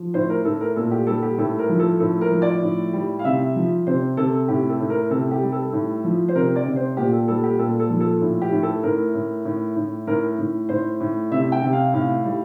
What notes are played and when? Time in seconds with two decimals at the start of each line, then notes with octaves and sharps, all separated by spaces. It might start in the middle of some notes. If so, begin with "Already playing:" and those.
Already playing: F3
0.14 A2 C5
0.30 A#4
0.45 A2 A4
0.61 A#4
0.76 A#2 A4
0.92 G4
1.07 G3 A4
1.23 G4
1.38 A2 A4
1.59 A#4
1.69 F3
1.80 A4
2.00 A2 A4
2.21 A#4
2.31 F3
2.42 D5
2.62 A2
2.93 G3
3.19 F5
3.25 C3 E5
3.56 F3
3.87 C3 C5
4.17 C3 A4
4.48 A2 G4
4.70 A4
4.80 A2
4.90 A#4
5.10 C3 A4
5.31 G4
5.42 G3
5.52 A4
5.73 A2
6.04 F3
6.29 C5
6.35 C3 A#4
6.56 D5
6.66 C3
6.76 C5
6.97 A#2 G4
7.13 A4
7.28 G3 A4
7.43 G4
7.59 A#2 A4
7.80 A4
7.90 F3
8.01 A4
8.21 A2
8.42 G4
8.52 A2
8.63 A4
8.83 A2 A#4
9.14 A2
9.45 A2
9.76 A2
10.07 A2 A#4
10.39 A2
10.69 A2 C5
11.00 A2
11.31 C3 E5
11.52 G5
11.62 C3
11.73 F5
11.94 A2 F5
12.24 G3